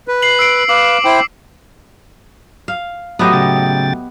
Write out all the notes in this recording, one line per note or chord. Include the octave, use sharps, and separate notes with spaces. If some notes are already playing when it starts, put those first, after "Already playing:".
B4
C7 F#7
E6 C7 D7
B4 F5 D6
E4 C5 G5
F5
A2 F#3 B3 G4 D#5
C#3 G5 A6